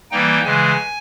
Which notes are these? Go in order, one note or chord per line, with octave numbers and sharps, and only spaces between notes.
E3 G3 A#3 D#4 G5
C#3 E3 G#3 G#5